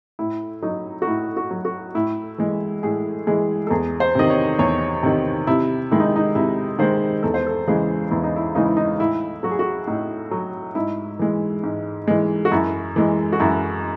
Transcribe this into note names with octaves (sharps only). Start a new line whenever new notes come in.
A2 E4
F#3 D#4
F#4
A2 E4
F#4
F#3
F#4
A2 E4
E3 G#3
A2 G#4
E3 G#3 G#4
A4
E2 G#4
C5
C3 D#3 D#5
C#5
E2 C#5
C3 D#3
C3 E4
D#3 G#3 E4
D#4
D#4
C3 E4
D#3 G#3 C5
E2 A4
C5
A4
C#3 E3 G#3 G#4
E2 E4
D#4
E4
C#3 E3 G#3 D#4
E4
D#4
A2 E4
F#3 F#4
G#4
F#4
A2 D#4
F#3
G#2 E4
E3 G#3
G#2
E3 G#3
F#4
F#2 E4
E3 G#3
F#4
F#2 E4